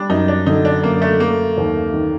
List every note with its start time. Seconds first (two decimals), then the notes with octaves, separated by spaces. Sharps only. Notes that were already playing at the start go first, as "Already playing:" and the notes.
Already playing: G3 D4
0.10 F#2 D#4
0.28 D4
0.46 D3 D#4
0.65 D4
0.83 F#2 A#3
1.02 A3
1.20 A3 A#3
1.58 D#2
1.94 D#3